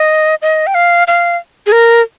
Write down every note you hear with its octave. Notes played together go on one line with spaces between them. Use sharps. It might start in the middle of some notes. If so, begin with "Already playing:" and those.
Already playing: D#5
D#5
G5
F5
F5
G#4
A#4